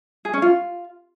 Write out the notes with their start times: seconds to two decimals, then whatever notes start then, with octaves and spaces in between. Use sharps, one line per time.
0.25 G#4
0.34 C#4
0.42 F4